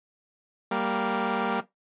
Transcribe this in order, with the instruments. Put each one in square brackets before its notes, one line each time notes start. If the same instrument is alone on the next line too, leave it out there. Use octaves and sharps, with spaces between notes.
[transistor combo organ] G3 A#3